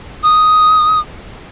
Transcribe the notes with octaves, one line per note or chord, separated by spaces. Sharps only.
D#6